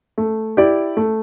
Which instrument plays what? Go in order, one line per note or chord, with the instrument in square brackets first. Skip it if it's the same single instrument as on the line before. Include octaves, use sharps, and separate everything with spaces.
[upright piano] A3
E4 G4 D5
A3